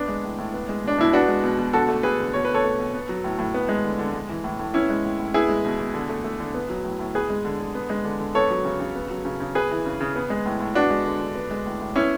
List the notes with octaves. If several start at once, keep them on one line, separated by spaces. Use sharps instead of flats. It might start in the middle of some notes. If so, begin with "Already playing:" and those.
Already playing: B3 D4
G#3
A2
A2
B3
G#3
B2 D4
B2 E4
B3 D4 F#4
G#3
B2
B2
D3 F#4 A4
A3
A3 G#4 B4
D3
B2 C#5
A3 B4
A4 C#5
A3
B2
B3
F#3
A2
A2
B3
G#3
D3
D3
G#3
E3
A2
A2
B3 C#4 E4
G#3
A2
A2
B3 E4 G#4
G#3
B2
B2
D3
A3
A3
D3
B3
F#3
A2
A2
B3 G#4 B4
G#3
D3
D3
B3
G#3
D3
D3
B3 A4 C#5
F#3
C#3
C#3
B3
F#3
C#3
C#3
B3 G#4 B4
E3
C#3
C#3
B3
G#3
A2
A2
B3 D4 F#4
G#3
D3
D3
B3
G#3
A2
A2
B3 C#4 E4